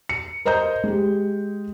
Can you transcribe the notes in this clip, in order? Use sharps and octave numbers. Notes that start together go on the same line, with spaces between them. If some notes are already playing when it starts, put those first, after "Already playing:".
C#7
A#4 C5 D#5 A#5 G6
G#3 G4